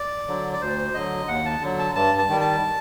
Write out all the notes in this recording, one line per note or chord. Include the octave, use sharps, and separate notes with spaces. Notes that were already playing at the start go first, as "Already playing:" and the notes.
Already playing: D5
D3 F#3
D5
D2 C5
D3 F#3 D#5
D#2 F#5
A5
D3 F#3
A5
G2 A5
A5
D#3 G3
A5